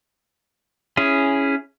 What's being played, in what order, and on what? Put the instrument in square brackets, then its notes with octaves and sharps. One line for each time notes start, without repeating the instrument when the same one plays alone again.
[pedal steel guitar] C#4 E4 G#4